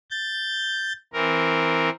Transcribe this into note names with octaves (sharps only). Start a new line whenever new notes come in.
G6 A6
E3 C4 A#4